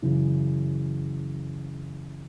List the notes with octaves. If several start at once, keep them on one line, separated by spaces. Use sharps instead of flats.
F#2 C#3 E3